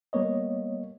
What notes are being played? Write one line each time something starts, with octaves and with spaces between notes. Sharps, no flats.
G3 A#3 B3 C#5 D#5